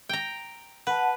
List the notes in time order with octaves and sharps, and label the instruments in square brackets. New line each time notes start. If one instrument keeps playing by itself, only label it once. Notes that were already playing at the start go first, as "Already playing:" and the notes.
[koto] G5 A#5
[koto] B4 [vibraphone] F#5 A5